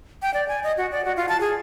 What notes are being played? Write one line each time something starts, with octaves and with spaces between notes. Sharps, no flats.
G5
D5
G#5
D#5
F#4
D5
F#4
F4
A5
G#4